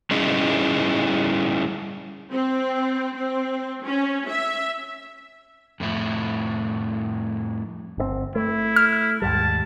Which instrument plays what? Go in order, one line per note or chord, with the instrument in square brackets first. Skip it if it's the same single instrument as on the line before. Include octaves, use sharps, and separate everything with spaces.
[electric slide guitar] G3 C#4 D#4 E4 G#4
[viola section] C4
C4
C#4
E5
[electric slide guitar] F2 A2 E4
[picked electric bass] G1 C#3 C4
[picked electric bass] A3 [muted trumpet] E4
[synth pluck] F6
[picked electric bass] D#2 G#2 G3 [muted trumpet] A5